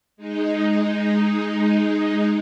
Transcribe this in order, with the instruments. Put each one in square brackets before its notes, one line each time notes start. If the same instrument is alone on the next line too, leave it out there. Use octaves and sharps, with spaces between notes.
[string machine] G#3 D#4